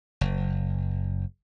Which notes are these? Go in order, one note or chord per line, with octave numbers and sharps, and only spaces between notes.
F#1